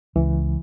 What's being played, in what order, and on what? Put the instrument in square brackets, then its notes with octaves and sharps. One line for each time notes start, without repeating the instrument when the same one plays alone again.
[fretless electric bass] C#2 [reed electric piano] E3